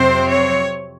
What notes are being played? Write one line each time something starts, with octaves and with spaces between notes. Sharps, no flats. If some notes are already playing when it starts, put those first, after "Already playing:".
Already playing: F2 C3 F#3 C4 C5
C#5